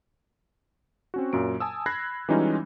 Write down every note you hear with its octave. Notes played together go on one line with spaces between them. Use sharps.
C4 C#4 F#4
F#2 A#2 F#3 D7
G#5 A5 D#6 E6
B5 F#6 G#6 A#6 C7
E3 G3 G#3 C#4 D#4 F4